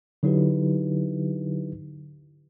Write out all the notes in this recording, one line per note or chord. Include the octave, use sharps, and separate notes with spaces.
D3 F#3 D#4 E4 G4 B4